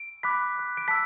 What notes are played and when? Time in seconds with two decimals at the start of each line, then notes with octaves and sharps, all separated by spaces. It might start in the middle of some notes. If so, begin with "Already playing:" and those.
Already playing: D7
0.23 B5 D6 F#6 B6
0.56 B5 D6 F#6
0.77 D7
0.88 A5 E6 B6